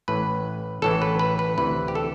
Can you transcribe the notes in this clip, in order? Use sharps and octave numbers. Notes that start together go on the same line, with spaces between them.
A1 A2 E3 B4
A1 A2 E3 A4
B4
B4
B4
D2 C3 E3 B4
G4
A4